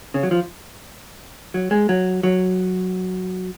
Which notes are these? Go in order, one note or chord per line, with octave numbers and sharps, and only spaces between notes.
C#3
F#3
F3
F#3
G#3
F#3
F#3